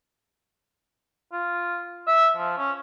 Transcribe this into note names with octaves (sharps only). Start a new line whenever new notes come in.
F4
E5
F3
C#4